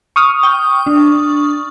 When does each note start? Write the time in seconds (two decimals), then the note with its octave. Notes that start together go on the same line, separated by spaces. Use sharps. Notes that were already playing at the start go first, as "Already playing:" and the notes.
0.16 C#6 D#6 F6
0.43 G5
0.86 D4